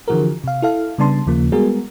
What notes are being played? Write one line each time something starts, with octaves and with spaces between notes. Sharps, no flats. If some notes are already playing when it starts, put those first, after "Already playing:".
D3 E3 F3 F#4 G#4 A#4
C3 F5
E4 A4 F5
C#3 G3 B3 D4 A5 C6
D#2 C#3 F3 A#3
G3 G#3 B3 F#4 G#4 A#4